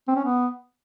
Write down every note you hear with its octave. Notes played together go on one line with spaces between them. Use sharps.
C4
C#4
B3